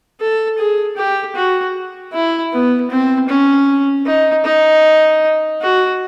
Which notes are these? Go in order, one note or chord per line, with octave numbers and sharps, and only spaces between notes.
A4
G#4
G4
F#4
E4
B3
C4
C#4
D#4
D#4
F#4